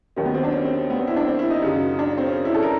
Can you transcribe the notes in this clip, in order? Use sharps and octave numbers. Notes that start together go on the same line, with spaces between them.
D#2 D#3 F#3 C#4
B3
C4
D4
C#4
C4
B3
C4
E4
D4
C4
E4
D#4
F#2 C#3 F#3
D4
C4
C#4
E4
A4
A#4